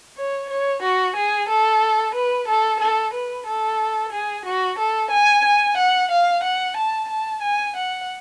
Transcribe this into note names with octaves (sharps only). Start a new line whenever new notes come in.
C#5
C#5
F#4
G#4
A4
B4
A4
A4
B4
A4
G#4
F#4
A4
G#5
G#5
F#5
F5
F#5
A5
A5
G#5
F#5